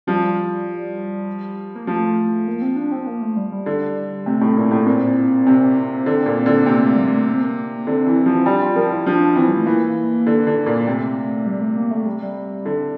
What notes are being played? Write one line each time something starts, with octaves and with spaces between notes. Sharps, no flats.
F3 G3
A#3
F3 A3
A#3
C4
D4
C4
A#3
A3
G3
G3
D3
C3 A3
A2
A#2
A2
A#2 C4
C3
D3
A#2
D3
C3 A#3
A3
G3
A3
A#3
C4
A#3
D3 C4
E3
F3
G3 D4
F4
F3 A#4
E4
F3 D4
E3 C4
G3
A3
E3 A#3
D3
D3
A#2
C3 A3
G3
A3
A#3
A3
G3
G3
D3